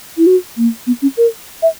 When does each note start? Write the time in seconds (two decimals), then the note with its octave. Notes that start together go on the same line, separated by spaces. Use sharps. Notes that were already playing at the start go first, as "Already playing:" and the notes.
0.18 E4
0.27 F#4
0.57 A#3
0.87 B3
1.02 C#4
1.17 A#4
1.62 E5